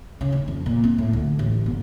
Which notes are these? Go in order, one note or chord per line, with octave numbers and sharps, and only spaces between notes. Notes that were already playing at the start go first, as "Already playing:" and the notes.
C#3
D#2
F2
A#2
C4
A2
D2
A1
G1